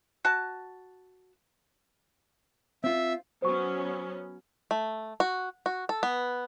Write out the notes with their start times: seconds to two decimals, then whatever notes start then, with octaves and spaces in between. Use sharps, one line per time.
0.25 F#4 A5
2.84 C4 F4 E5
3.42 F#3 B3 C#4 C5 C#6
4.71 A3
5.20 F#4
5.66 F#4
5.89 A4
6.03 B3